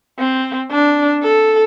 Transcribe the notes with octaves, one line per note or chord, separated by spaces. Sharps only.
C4
D4
A4